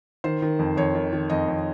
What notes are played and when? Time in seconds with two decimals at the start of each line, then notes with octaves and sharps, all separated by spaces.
0.24 D#3 C5
0.42 D#3
0.59 F2
0.77 F2 C#5
0.95 D#3
1.12 D#3
1.30 F2 D#5
1.48 F2